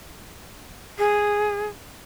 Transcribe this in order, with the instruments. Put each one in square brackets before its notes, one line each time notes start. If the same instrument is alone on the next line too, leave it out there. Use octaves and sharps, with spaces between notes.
[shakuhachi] G#4